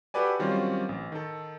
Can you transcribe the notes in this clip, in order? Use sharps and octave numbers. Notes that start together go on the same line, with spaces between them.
F#4 G4 A4 B4 D5 G#5
D#3 F#3 G3 C4 C#4 F4
A1
D#3 A4